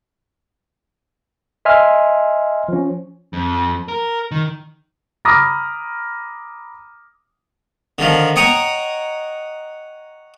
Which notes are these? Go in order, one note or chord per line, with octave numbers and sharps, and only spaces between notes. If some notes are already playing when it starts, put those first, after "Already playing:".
D#5 E5 G#5 C6 F6
F3 C#4
F2
A#4
D#3
A#5 B5 D6 D#6 F6 A#6
D3 D#3 F3
C#5 D#5 F#5 G5 A#5